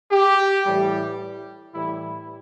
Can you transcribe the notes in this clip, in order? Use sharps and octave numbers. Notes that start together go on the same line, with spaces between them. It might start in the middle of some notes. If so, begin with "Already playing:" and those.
G4
A2 E3 G3
A2 E3 G3 E4